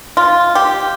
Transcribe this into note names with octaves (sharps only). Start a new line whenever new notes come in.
F4
G4